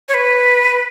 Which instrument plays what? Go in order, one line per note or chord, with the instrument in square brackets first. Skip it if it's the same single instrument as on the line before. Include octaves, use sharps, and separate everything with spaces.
[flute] C#5
B4